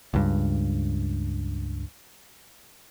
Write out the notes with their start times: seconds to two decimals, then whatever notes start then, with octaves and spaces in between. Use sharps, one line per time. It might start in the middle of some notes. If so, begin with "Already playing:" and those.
0.14 C#2 G2